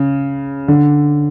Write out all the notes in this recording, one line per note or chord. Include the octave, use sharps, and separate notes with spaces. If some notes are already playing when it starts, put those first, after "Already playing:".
Already playing: C#3
D3